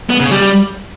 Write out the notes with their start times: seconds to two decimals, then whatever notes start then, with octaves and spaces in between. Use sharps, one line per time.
0.10 B3
0.20 C#3
0.31 G3